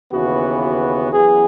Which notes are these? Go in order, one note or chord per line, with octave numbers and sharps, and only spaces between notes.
D#2 C#3 E3 B3 F#4
F#4
F#2 E3 B3 G#4